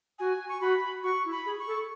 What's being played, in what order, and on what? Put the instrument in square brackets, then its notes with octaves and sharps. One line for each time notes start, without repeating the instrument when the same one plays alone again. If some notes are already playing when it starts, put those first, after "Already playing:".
[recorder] F#4 [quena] G#5
[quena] C#6
[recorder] F#4 [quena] B5
[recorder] F#4 [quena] C#6
[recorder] E4
[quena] B5
[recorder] G#4
[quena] C#6
[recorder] A4